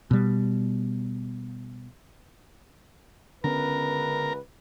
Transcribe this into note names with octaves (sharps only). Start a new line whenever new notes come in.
B2 G3
C#2 D3 B3 C#4 A#4 B4